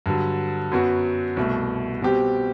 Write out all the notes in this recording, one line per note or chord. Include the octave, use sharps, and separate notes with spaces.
G2 D3 F#3
F#2 F#3 B3 F#4
C2 B2 A3
B2 G3 C4 G4